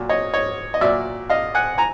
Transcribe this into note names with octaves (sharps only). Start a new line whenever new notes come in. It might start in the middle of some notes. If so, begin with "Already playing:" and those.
Already playing: A#2 F#3
C#5 D#5
C#5 D#5
D#5
A#2 F#3 D5 E5
D#5 F5
F#5 G#5
G#5 A#5